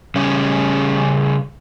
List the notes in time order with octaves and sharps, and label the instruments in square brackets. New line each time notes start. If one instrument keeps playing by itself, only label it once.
[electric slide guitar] C#3 G3 C#4